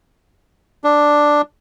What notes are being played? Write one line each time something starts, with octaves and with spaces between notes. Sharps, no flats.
D4